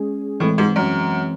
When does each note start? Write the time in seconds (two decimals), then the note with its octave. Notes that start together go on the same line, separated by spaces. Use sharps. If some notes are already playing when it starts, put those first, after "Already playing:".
Already playing: G#3 C#4 G#4
0.40 A2 E3 G#3 C4
0.58 G#2
0.76 F#2